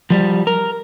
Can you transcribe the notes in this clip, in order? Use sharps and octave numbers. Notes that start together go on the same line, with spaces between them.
F3 G3
A#4